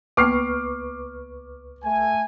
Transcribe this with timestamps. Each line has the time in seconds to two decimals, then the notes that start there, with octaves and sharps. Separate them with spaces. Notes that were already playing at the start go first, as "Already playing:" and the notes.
0.17 C#2 A#3 B3 B4 C#6 D6 F6 C7
1.85 A3 G#5